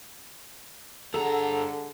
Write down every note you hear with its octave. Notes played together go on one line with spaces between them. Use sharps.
G2 D3 G#4 A4 F#5 A#5